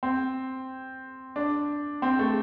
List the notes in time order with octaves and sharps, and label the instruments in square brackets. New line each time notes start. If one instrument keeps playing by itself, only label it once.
[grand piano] C4
D4
C4
A3